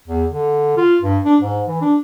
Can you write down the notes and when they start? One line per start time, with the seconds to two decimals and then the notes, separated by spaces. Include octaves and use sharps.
0.08 E2
0.31 D3
0.77 F4
1.02 G2
1.25 D4
1.40 G#2
1.67 E3
1.82 D4